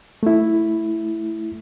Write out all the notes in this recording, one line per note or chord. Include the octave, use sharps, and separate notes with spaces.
A3 E4